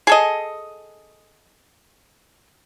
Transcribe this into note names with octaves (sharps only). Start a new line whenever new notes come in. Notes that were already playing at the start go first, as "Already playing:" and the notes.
G#4 A4 D#5